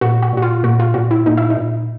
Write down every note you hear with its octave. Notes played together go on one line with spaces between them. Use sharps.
A#2 F#4
F#4
A#2 F#4
F4
A#2 F#4
F4
A#2 F#4
E4
A#2 D#4
E4
D#4
A#2